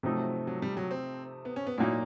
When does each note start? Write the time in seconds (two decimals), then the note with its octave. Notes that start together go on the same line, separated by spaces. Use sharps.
0.03 C3 F3 F#3 A3 C4 D#4
0.47 F#3
0.62 G3
0.77 F#3
0.91 C4
1.45 B3
1.56 C#4
1.67 B3
1.78 A#2 F#3 A#3 D#4 E4